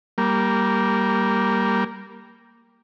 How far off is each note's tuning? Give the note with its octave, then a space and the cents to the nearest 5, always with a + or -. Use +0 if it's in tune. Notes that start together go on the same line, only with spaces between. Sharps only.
G3 -5 A#3 +0